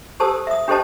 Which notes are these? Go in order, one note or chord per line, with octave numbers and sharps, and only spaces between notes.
G4 A4 C5 A5 D#6 E6
E5 D#6
D4 G4 A4 C5 D#5 A5